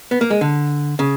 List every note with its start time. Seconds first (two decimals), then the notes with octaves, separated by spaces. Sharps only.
0.11 B3
0.21 A#3
0.31 G#3
0.41 D3
0.99 C#3